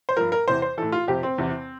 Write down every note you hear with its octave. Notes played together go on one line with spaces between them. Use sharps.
C5
G2 F3 A#4
A#4
E2 C3 E3 C5
C5
A2 E3 A4
F4
F2 C3 F3 G4
C4
E2 C3 E3